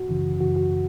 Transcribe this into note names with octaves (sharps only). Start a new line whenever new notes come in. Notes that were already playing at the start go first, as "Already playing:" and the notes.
Already playing: F#4
F#2 C#3 E3
F#2 C#3 E3 F#4
F#4